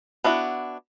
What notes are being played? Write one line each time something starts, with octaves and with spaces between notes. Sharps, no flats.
B3 D4 E4 F#4